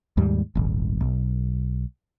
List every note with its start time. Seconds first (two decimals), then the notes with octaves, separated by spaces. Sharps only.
0.17 D#2 G#2 G3
0.55 D#1 G#1
1.01 B1